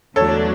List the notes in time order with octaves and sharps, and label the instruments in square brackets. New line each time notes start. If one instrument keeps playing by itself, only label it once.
[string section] E2 D3 F#3 A3 D4 [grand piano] A4 C#5